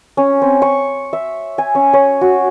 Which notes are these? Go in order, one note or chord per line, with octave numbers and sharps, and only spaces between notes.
C#4
C4
C#6
E5
G#5
C#4
C#5
F#4